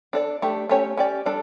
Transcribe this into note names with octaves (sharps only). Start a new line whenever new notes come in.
D4 A4 D5
A3 D4 G4
A3 C#4 G4 C#5
C#4 G4 D5
G3 D4 A4 D5